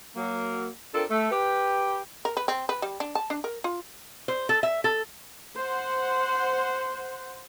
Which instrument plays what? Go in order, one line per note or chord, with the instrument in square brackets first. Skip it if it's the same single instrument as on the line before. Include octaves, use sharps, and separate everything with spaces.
[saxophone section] F#3 A#3
C4 D4 F4 A4 A#4
A3
G4 B4
[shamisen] A#4
B4
C4
B4
G3
D4
A5
D4
A#4
F4
[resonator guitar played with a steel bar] C5
A4
E5
A4
[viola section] C5 F#5